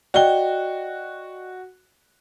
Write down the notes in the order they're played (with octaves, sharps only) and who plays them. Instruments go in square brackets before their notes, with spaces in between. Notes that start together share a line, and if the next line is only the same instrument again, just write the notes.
[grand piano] F#4 G7 [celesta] D5 D#5 G5